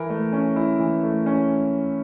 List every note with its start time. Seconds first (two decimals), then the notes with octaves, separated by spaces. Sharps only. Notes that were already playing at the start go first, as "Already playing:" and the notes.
Already playing: E3 E4 A#4
0.09 A3
0.33 C#4
0.56 E4
0.79 E3
1.03 A3
1.26 C#4